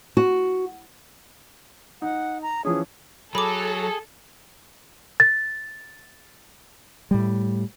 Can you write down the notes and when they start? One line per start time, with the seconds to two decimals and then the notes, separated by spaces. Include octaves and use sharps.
0.17 F#4
2.02 D#4 F#5
2.42 A#5
2.65 E3 F3 C#4 G#4
3.35 F#3 G#4 A4 B5 D6
5.20 A6
7.11 A2 G3